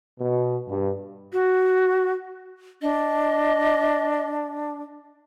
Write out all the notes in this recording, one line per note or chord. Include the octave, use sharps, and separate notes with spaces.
B2
G2
F#4
D4 D#5